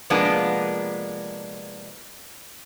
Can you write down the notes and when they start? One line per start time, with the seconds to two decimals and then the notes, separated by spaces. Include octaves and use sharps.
0.10 C3 F3 G#3 A#3 B3 D4